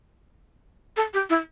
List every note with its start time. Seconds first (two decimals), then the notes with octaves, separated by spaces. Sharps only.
0.97 A4
1.14 G4
1.30 E4